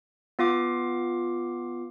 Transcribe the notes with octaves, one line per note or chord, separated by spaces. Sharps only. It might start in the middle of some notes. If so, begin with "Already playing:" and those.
B3 F4 F5 D6